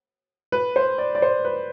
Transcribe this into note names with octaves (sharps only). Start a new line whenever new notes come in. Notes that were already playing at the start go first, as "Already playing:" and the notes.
B4
C5
D5
D5
C5
B4